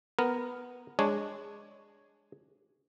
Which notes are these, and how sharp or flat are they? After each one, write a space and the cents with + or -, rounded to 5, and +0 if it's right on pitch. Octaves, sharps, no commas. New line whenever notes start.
B3 +0 A#4 +0
G#3 -10 D4 +0 C#5 +0